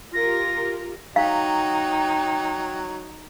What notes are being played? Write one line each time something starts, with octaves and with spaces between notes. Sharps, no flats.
F4 G4 A#4 A#6
F#3 D#4 F5 G5